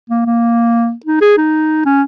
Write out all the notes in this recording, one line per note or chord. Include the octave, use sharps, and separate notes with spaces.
A#3
A#3
D#4
G#4
D#4
C#4